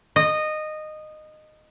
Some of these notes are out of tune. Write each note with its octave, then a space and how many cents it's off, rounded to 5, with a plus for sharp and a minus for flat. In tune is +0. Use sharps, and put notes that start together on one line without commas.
D#5 -15